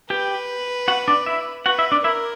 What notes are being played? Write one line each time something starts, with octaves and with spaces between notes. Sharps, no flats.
G4 B4 G5
F#4 F#5
D4 D5
E4 E5
F#4 B4 F#5
E4 E5
D4 D5
E4 A#4 E5